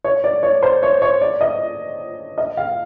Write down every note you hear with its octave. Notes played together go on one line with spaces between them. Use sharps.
C#5
D5
C#5
C5
C#5
C#5
D5
D#5
D#5
F5